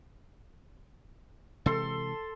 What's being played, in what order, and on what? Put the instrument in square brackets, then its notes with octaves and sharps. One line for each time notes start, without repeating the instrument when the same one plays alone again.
[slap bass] C3 E3 G#3 [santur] A4 C6